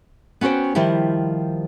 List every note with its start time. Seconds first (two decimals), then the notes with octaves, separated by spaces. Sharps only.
0.41 B3 C#4 F#4 C5 G5
0.75 D#3 F3 G3 E4 G4